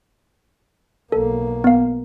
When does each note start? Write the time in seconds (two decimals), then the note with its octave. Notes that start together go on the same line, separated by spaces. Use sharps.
1.12 B1 A#3 A4
1.64 B3 F5